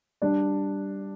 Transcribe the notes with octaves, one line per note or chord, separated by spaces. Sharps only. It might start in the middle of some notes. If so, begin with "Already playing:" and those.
G3 D4 D5